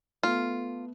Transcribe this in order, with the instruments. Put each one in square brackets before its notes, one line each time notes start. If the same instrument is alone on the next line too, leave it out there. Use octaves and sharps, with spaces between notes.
[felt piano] A3 B3 [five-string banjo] F4